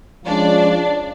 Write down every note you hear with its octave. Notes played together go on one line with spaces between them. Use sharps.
F3 G#3 C#4 D4 F4 D5